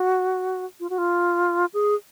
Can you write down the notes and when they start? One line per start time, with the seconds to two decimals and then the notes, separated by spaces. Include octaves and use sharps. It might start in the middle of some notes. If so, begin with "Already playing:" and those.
Already playing: F#4
0.80 F4
0.90 F#4
0.98 F4
1.74 G#4